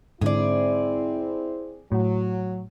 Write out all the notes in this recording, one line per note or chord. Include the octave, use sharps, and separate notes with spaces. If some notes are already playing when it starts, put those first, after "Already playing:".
G#2 D3 C4 E4 G#4 D5
A2 F#3